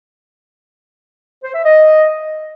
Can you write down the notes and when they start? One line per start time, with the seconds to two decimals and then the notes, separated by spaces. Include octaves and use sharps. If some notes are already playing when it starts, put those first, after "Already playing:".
1.43 C5
1.53 E5
1.64 D#5